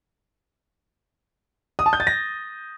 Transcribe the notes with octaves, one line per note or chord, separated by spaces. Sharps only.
D#6
A5
G6
A6
A#6